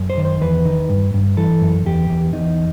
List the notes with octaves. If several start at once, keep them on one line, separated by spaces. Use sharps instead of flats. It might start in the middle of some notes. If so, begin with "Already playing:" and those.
Already playing: F#2
C5
D#3
C5
E2 B4
D#3
G2
G2
E3 A4
F#2
E2 G4
E2
E2 D#4